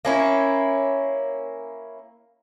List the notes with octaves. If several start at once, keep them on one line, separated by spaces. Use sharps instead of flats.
A#3 C#4 E4